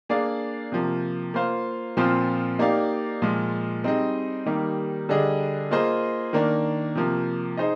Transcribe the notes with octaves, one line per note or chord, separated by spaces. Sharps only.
A#3 D4 G#4 D5 F5
C3 F3 A#3
A#3 F4 C5 F5
A#2 F3 C4 F4 C5
A#3 D#4 G4 D5 F5
A#2 F3 G#3
G3 C4 D#4 G#4 D#5
D#3 G3 A#3 D#4 G4
D3 G3 D4 G#4 D#5
A#3 F4 G#4 C5 D#5
D#3 A#3 D4
C3 F3 A#3
D#4 G#4 C5 D#5